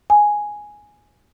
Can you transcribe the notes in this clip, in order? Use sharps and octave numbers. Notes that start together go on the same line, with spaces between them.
G#5